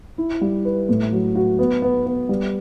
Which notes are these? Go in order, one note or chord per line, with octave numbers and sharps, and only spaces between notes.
E4
G3
B4
A2
F#3
F#4
B3
B3
B3
G3